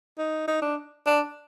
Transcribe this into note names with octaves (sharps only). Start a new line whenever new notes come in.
D#4
D#4
D4
D4